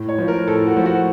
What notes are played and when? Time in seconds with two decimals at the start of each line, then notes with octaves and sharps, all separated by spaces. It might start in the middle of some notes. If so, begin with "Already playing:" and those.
Already playing: A2
0.09 C#5
0.18 F3
0.28 A#4
0.47 A2 A4
0.67 F#4
0.77 F3
0.86 F#4